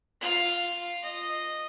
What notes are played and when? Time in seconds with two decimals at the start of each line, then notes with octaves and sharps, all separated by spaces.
0.21 F4
1.03 D#5